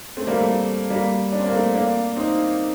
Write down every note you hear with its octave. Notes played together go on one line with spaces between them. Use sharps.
A3 C4
G3 A#3
A3
A3
G3 A#3
D4
C4
A#3
A3 C4
A#3 D4
C4 D#4